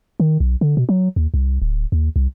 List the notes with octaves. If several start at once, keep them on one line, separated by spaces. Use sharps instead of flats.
D#3
B1
D3
B2
F#3
D#2
C2
D1
D#2
C2